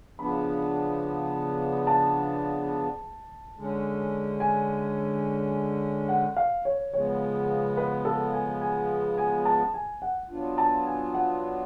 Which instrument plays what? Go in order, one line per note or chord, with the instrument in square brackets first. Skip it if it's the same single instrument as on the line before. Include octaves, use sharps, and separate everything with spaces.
[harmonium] C#3 F3 B3 D4 [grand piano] B5
[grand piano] A5
[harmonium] D3 G#3 C#4
[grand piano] G#5
F#5
F5
C#5
[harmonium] C#3 F3 G#3 B3 [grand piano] C#5
[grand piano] B4
A4
G#5
G#5
G#5
A5
G#5
F#5
[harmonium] F#3 B3 D4 F4
[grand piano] A5
G#5
F#5